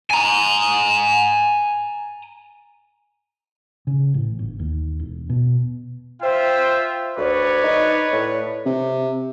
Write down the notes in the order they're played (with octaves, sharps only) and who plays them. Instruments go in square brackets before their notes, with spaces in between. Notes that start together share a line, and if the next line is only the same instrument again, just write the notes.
[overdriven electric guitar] G#5 A#5
[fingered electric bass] C#3
A1
G1
D#2
E1
B2
[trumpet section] F4 E5 G5 [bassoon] C5
[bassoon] D2 [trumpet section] B4 C#5 D5
[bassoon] D#4
A2
[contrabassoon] C3